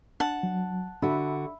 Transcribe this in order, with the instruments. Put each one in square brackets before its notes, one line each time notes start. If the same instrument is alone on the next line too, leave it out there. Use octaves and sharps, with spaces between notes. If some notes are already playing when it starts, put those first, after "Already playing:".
[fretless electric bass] D4 [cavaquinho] F#5 A5
[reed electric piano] F#3
[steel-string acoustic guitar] D3 F#4 [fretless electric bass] D4 [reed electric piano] E5 B5 E6